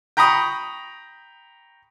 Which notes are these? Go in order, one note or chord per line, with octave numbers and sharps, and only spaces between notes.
G5 A#5 B5 C#6 D#6